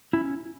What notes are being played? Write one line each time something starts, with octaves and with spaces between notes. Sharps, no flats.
C#4 E4